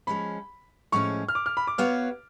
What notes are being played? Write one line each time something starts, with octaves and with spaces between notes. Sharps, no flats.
F3 G#3 C#4 B5
A2 F3 G#3 C#4 C#6
F6
D6
F6
B5
D6
B3 F#4 C#5 F5 F6